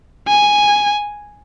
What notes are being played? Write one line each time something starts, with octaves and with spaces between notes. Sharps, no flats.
G#5